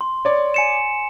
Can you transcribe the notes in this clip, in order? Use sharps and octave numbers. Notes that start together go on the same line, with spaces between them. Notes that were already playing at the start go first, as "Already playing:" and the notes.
C6
C#5 D5
G#5 C#7 E7